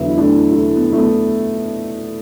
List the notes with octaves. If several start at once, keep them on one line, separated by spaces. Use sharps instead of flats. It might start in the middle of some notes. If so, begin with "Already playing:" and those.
Already playing: E2 D3 F#3 B4 E5
E4
A3 D4
A3
B3
A3
B3